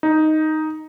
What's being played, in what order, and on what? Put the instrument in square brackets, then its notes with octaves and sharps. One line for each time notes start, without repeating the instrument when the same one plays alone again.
[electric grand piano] D#4